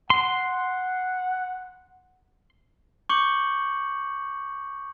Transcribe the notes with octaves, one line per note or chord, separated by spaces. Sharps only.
F#5 C6
C#6 D6 G6 C#7 F#7